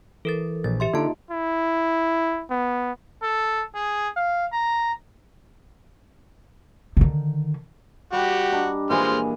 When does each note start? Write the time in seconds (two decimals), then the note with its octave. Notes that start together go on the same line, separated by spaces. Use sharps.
0.25 E3 A4 A#4 A6
0.64 A#1 A6
0.80 G4 E5 C6
0.94 D3 A#3 D#4 F4 A5
1.31 E4
2.50 B3
3.23 A4
3.75 G#4
4.17 F5
4.53 A#5
6.97 D3 D#3
8.13 G3 F#4 G4
8.52 D4 D#4
8.90 A#2 E3 G#3 G#4 C5 F6